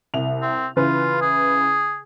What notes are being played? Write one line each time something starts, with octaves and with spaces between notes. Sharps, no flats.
C2 F7
C4
C#3 E3 F4 B4
G#4